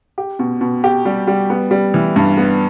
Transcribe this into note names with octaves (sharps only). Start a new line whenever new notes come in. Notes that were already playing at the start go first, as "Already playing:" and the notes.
G4
B2
B2
G4
G3
G3
B3
G3
E3
G2
B3